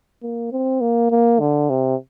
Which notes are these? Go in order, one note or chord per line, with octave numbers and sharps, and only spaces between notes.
A#3
C4
A#3
A#3
D3
C3